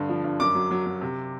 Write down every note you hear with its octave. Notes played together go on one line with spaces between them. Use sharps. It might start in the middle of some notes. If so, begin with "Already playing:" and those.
Already playing: G2 D3
F3
G2
F#2 D6
F#3
F#3
F#3
C3